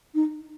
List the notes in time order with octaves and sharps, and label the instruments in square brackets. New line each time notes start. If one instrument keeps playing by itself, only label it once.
[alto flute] D#4